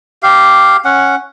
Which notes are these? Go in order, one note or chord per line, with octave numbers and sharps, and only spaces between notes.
G4 F5
C#4 F#5